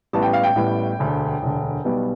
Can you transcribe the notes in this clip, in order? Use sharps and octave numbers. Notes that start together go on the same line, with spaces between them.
A1 A2 G3 B3 A5
G5
F5
G5
A1 A2 G3 B3
E1 D2 D3
E1 D2 D3
B1 B2 G3 B3